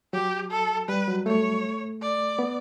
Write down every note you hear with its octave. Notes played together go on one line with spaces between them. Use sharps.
F#3 G4
A4
G3 B4
F#3
A3 C#5
D5
B3